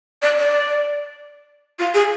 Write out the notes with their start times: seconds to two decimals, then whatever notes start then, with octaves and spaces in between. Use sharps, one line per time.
0.22 D5
0.37 D5
1.79 F4
1.94 G#4